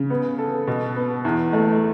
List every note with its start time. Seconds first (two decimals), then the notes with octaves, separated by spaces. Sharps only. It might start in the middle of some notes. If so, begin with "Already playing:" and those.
Already playing: C#3
0.10 B3
0.38 A4
0.67 B2
0.96 B3
1.25 E2
1.53 A3